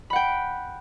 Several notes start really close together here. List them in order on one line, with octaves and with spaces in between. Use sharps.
B5 F#5 G5